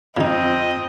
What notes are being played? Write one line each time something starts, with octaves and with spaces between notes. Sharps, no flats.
F2 C#3 C4 D#4 D#5